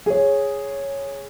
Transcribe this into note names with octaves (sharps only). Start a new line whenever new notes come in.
G#4 C#5